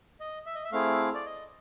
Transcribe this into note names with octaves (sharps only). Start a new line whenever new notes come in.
D#5
E5
D#5
E5
A3 C4 E4 G#4 F5
D5
D#5